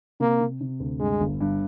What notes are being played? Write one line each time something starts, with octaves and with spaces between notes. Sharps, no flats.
C3 A#3
C3
C3
D2
G2 G#3
G1
G2